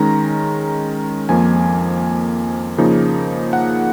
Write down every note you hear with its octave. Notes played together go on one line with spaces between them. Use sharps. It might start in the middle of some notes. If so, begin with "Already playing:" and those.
Already playing: D#3 G#3 C#4 A#5
F2 F3 A#3 G#5
C#3 F3 A#3 D#4
F#5